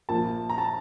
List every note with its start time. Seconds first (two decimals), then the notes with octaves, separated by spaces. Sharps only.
0.09 A#1 A#2 F3 A#3 A5
0.50 A#5
0.58 A5